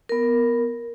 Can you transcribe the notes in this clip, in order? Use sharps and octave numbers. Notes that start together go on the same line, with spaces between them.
B3 A#4